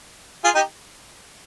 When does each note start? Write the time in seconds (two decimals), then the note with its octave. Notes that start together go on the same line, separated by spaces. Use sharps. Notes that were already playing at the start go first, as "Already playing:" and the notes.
0.44 F4 G#4
0.55 D#4 G4